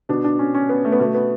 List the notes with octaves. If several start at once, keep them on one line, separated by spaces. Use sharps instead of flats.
B2 D4
D4
C#4
C#4
B3
A3
B3
B2 A3
B3